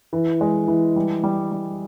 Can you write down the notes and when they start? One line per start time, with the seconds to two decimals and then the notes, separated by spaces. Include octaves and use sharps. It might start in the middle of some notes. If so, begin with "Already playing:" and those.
0.13 E3
0.41 G#3
0.68 E3
0.96 G3
1.24 G3
1.52 G3